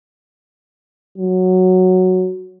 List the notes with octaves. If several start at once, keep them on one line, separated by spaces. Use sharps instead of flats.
F#3